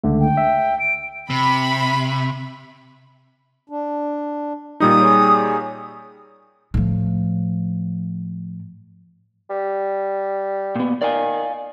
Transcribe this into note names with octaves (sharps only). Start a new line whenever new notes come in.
C#2 D3 A3
G5
E5
D7
C3 B5
D4
A#2 G3 D#4 D#6
G#4 C#5
A2 F3
G3
A#2 B3
D#3 D5 F5 G#5